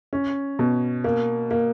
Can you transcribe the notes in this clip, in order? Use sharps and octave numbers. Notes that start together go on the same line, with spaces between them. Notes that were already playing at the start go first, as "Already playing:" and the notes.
C#4
B2
A#3
A#3